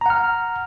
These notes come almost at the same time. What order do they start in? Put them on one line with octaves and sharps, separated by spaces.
A#5 F#5 F6